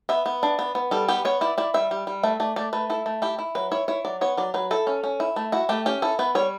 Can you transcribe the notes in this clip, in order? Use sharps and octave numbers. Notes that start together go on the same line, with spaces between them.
B3 E5
B3
D4
B3
B3
G3 A4
B3 G4
B3 C#5
E4 D5
E4 D5
G3 E5
G3
G3
A3 E5
A3 D5
A3 D5
A3 B4
E4 A4
A3
E4 G4
E4
F#3 B4
E4 C#5
E4 C#5
F#3 D5
B3 C#5
F#3 D5
F#3 B4
E4 A4
C#4
C#4
E4
A3
E4 F#4
A3 G4
C#4 G4
E4 A4
B3 B4
G3 C#5